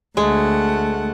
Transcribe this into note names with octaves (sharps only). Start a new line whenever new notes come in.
D2 G#3 A3 F#5